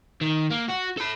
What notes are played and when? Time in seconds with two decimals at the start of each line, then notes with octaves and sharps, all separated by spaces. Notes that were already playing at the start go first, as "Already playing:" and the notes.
0.21 D#3
0.50 A#3
0.68 F#4
0.97 A4 B5